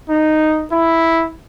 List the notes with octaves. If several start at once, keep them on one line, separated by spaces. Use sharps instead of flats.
D#4
E4